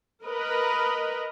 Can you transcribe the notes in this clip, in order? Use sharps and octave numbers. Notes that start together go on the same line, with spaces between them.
A#4 B4 D#5